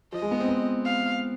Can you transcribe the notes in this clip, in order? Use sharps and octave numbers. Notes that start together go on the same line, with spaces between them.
F3 D#5
G#3
B3
C4
B3
F5